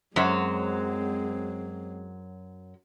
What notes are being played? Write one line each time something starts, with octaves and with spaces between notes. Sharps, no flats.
F#2 F#3 G#3 C4 C5